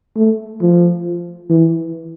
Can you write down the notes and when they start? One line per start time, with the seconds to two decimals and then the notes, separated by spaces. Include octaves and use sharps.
0.16 A3
0.62 F3
1.50 E3